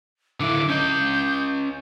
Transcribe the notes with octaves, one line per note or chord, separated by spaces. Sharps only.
D3 E4 D6
C#4 D#5 G6